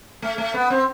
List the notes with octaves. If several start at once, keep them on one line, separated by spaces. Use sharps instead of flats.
A3
A3
B3
C4